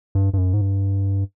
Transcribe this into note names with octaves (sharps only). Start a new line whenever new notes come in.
G2
G2
F#2
G#2
G2